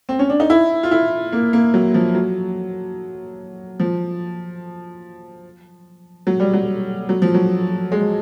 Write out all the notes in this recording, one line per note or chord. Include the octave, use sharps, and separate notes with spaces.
C4
C#4
D4
D#4
E4
F4
E4
A#3
A#3
F#3
F3
F#3
F3
F#3
G3
F#3
F#3
F3
F#3
G#3